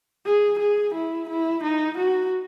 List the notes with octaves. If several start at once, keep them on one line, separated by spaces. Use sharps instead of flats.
G#4
G#4
E4
E4
D#4
F#4